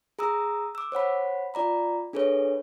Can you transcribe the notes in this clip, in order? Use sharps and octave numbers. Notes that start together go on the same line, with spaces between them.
G#4 A#5 D#6 E6
D6 E6
C5 C#5 F#5 B5
F4 D5 A#5 B5
D4 G#4 A4 B4 C#5